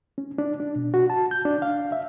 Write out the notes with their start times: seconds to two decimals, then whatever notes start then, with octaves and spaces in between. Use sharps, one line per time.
0.18 C#4
0.38 D4
0.60 D4
0.76 B2
0.94 F#4
1.10 A5
1.31 G6
1.45 D4
1.62 F5
1.92 E5